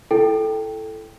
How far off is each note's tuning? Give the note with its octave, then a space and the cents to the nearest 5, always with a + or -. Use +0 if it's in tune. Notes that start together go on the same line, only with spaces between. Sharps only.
E4 +30 A4 -5 G5 +0